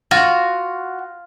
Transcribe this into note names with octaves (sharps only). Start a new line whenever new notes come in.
F4 F#4